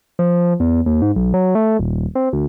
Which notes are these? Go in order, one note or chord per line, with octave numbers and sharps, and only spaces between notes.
F3
E2
D#2
G#2
B1
F#3
A3
D#1
C4
D2